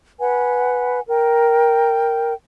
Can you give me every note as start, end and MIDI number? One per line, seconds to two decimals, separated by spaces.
0.20 1.00 71
0.20 1.00 78
0.20 1.00 80
1.08 2.33 70
1.08 2.33 79